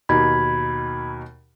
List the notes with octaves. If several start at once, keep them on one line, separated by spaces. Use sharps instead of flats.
D#2 B2 D#4 B5 G#6